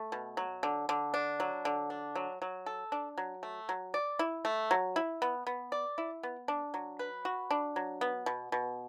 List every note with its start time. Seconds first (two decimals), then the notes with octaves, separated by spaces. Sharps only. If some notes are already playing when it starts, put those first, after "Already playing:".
Already playing: A3
0.12 B2
0.37 F#3
0.63 D3
0.89 D3
1.14 D4
1.40 F#3
1.65 D3
1.90 D4
2.15 F#3
2.42 F#3
2.66 A4
2.92 D4
3.18 F#3
3.43 A3
3.69 F#3
3.94 D5
4.19 E4
4.45 A3
4.71 F#3
4.96 E4
5.22 B3
5.47 B3
5.72 D5
5.98 E4
6.23 B3
6.48 D4
6.74 F#3
6.99 B4
7.25 F#4
7.51 D4
7.76 F#3
8.01 B3
8.26 B2
8.52 B2